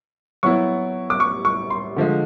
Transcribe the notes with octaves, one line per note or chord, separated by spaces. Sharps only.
F#3 B3 E4 C#6
D6
C#6
C#6
C6
D3 F3 G#3